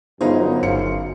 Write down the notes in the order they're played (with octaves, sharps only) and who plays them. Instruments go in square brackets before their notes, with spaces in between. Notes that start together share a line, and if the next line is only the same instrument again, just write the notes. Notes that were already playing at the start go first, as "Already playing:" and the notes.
[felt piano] G1 D#4 G#4 [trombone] F#2 [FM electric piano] B3 F4 C5
[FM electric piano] G1 F5 C6 [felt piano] C#7